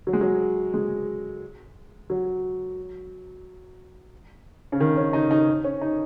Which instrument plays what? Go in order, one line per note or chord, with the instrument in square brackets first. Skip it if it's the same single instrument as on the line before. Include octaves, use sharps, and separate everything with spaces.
[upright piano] F#3
G#3
F#3
G#3
F#3
C#3
D#3
C#4
D#4
D#4
C#4
D#4